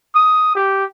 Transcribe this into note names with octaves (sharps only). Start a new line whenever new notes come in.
D#6
G4